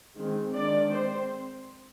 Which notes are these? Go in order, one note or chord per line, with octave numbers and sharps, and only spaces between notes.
D#3 G#3 C4
D#3 G#3 D4 D5
C4 C5